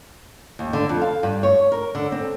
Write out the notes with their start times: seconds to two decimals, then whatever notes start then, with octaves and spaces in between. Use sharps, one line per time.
0.59 D#2
0.73 D3
0.89 F2
1.01 F5
1.23 G2
1.43 C#5
1.72 A#4
1.95 D3
2.12 C4